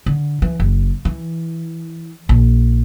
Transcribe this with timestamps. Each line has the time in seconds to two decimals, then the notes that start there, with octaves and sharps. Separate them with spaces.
0.06 D3
0.42 E3
0.60 F#1
1.05 E3
2.29 A#1